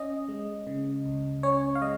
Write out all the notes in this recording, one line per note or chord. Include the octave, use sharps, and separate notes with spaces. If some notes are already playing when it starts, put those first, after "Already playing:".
Already playing: C#4 D#5
G#3
C#3
C#2
C#4 C#5
F5
G#3 D#5